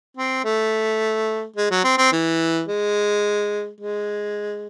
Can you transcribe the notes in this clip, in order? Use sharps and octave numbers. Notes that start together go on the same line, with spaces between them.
C4
A3
G#3
F#3
C4
C4
E3
G#3
G#3